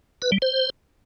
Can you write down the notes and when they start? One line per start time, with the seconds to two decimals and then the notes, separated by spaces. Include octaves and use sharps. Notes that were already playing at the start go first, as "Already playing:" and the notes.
0.22 B4
0.32 G3
0.42 C5